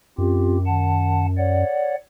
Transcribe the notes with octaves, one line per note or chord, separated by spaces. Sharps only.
F#2 C4 F4 G4
D#3 F#5 A5
C#5 D5 F#5